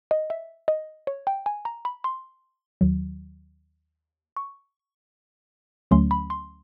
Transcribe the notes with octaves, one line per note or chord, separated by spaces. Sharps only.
D#5
E5
D#5
C#5
G5
G#5
A#5
B5
C6
D#2 D#3 F#3
C#6
D2 D3 F#3 A3 C#4 C6
B5
C6